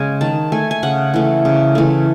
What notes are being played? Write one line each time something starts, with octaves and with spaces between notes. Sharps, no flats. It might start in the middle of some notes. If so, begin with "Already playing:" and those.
Already playing: C#3 G#3 G#5
D#3 A5
A3 G#5
G#5
C#3 F#5
E3 A3
C#3
E3 A3